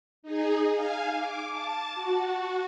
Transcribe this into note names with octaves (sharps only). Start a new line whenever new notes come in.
D#4 G#4
F5 G#5
D6
A5 A6
F#4